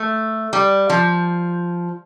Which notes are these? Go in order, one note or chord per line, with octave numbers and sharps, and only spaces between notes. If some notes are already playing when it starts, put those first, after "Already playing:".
Already playing: A3
G3
F3